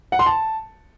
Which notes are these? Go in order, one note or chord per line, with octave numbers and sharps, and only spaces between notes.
F#5
C6
A5